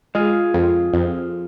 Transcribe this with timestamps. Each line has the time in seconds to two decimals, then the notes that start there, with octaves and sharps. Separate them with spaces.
0.15 G#3 F4 G#4
0.54 F2
0.93 F2